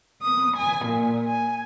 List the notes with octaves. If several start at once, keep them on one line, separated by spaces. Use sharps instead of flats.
D#6
G#5
A#2
G#5